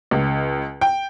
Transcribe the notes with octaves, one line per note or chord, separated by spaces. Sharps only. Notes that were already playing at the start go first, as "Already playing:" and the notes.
C#2
G5